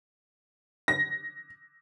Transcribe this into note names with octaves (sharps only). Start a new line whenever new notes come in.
A#6